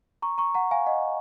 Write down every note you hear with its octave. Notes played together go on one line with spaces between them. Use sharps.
A#5 C#6
A#5 C#6
F#5 A#5
F5 G#5
D#5 F#5